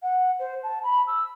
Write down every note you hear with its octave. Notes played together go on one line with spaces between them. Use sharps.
F#5
C5
A5
B5
E6